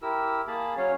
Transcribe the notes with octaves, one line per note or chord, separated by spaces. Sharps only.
E4 G4 A#4 E6
A#3 G#4 A5 B5
F#3 C#4 C#5 F5